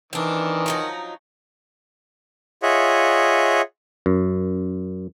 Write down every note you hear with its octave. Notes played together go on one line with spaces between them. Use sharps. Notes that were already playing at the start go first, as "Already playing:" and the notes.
D#3 E3 C4 D4
F3 F#3 D#4
F4 G#4 C#5 D#5 E5 F#5
F#2